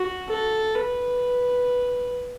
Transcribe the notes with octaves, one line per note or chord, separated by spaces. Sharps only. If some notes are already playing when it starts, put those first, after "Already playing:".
Already playing: F#4
A4
B4